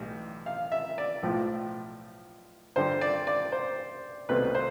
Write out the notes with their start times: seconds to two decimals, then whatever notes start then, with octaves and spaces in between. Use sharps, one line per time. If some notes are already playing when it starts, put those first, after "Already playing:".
Already playing: B1 A2 E3 G3
0.46 F5
0.72 E5
0.98 D5
1.23 B1 A2 F3
2.76 G2 D3 G3 C5
3.01 D5
3.27 D5
3.52 C5
4.29 C2 B2 A3 C4 B4
4.55 C5